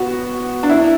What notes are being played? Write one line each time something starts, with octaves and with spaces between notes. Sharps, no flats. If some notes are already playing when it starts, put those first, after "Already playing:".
Already playing: B3 F#4
D4
E4